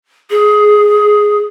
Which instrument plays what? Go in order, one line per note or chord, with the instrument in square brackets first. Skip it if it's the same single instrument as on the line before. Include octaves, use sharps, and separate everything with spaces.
[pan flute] G#4